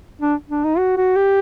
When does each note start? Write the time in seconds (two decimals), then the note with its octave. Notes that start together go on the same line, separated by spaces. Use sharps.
0.21 D4
0.50 D4
0.64 D#4
0.78 F#4
0.97 F#4
1.16 G4